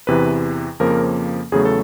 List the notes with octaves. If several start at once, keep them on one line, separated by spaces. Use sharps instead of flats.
E2 C3 E3 B4
F2 C#3 F3 A#3 A#4
E2 C#3 F#3 A3 G#4
A4